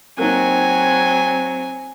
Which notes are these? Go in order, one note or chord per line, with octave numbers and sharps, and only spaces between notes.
F#3 A#3 C4 D#4 G#5